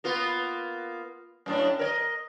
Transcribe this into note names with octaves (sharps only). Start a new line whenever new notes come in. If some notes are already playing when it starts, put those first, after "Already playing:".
A#3 B3 F4
F#2 A2 D4
A#4 C#5 D#5